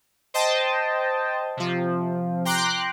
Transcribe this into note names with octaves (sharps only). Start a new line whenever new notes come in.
C5 D#5 G5 A5
C3 F3
G5 A#5 C6 D6 F#6